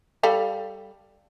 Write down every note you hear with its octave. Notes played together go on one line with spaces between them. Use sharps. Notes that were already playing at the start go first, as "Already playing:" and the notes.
G3 A4 F5